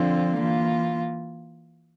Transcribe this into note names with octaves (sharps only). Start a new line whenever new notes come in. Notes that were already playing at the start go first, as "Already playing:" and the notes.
Already playing: D3 F3 C4 F4
E3 A#3 F4